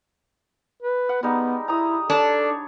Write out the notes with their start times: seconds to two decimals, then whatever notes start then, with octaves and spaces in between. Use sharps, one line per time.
0.83 B4
1.09 F#5
1.23 G3 G#3 B3 D#4
1.68 E4 A#5 D#6
2.10 D4 A4 C#5